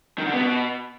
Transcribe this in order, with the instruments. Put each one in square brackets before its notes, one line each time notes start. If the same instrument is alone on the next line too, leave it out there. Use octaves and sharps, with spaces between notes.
[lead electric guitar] D#3
D3
B3
B2